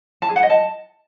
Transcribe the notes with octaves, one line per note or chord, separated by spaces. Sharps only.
A5
G#4
F#5
D#5
A5